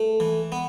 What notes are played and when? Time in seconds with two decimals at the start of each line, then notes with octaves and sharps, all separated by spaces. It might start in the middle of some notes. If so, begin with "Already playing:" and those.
Already playing: A3
0.20 E3
0.52 B3